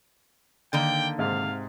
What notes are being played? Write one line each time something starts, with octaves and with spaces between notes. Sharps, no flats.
D3 D#3 A#3 G5
G#2 C3 F5